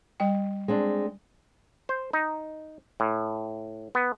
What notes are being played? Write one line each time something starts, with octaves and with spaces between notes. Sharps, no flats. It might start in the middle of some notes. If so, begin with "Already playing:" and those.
G3 G5
G#3 C4 D4
C5
D#4
A2
B3